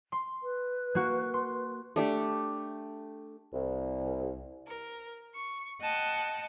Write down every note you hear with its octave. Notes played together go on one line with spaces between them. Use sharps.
C6
B4
A#3 F#4
C6
A3 D4 G4
C2
A#4
C#6
D#5 F#5 G5 A5